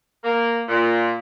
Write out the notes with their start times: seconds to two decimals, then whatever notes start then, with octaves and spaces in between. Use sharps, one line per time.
0.24 A#3
0.69 A#2